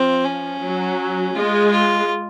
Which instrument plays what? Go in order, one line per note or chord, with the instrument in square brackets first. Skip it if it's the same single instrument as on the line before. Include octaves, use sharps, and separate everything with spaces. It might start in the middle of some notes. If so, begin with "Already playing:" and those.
Already playing: [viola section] F3 [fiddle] C4
[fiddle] C#4
[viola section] F#3
[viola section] G#3 [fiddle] F4
[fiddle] F4